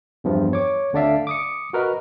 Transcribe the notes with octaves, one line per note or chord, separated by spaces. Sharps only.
E2 G2 F3
C#5 D6
D2 D3 D4 D5 E5 F5
D6 D#6 C#7
F#4 A#4 B4 D#5